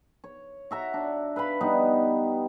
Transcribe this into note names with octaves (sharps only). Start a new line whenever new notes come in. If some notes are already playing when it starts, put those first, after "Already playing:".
C#5
F#4 E5 A#5
D4
B4 E5 F5 B5
G3 B3 D#4